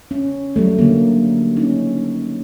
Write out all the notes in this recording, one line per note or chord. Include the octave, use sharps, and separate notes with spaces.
C#4
F#3 G3 A3
D3 A#3
C#4 D#4